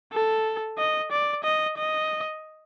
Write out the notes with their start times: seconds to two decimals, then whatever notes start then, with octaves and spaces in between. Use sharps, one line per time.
0.13 A4
0.78 D#5
1.11 D5
1.44 D#5
1.77 D#5